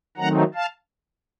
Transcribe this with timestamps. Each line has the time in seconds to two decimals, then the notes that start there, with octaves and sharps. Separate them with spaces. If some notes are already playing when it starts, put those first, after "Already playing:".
0.17 D#3 F#3 A3 C4 D#4 F#5 A#5
0.55 F5 A5